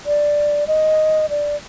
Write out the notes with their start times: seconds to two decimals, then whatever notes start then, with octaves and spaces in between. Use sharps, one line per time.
0.06 D5
0.67 D#5
1.30 D5